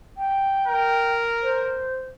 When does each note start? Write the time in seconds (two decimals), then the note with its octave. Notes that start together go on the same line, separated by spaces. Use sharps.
0.17 G5
0.67 A#4
1.42 C5